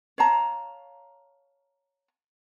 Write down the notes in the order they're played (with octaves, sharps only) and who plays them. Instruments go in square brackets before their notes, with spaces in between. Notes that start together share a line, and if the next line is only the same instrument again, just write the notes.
[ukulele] C#5 F5 A5 A#5